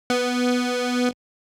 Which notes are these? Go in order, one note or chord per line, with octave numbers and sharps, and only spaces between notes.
B3